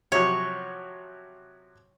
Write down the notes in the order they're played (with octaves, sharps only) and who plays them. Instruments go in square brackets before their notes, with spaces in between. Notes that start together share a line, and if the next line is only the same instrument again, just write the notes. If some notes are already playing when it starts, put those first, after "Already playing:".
[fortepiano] C3 F3 F#3 [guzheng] C#5